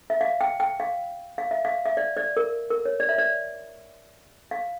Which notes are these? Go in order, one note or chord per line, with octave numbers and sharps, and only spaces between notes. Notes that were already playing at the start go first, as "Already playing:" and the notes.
E5
F5
G5
G5
F5
F5
E5
F5
E5
D5
D5
A#4
A#4
C#5
D5
E5
D5
F5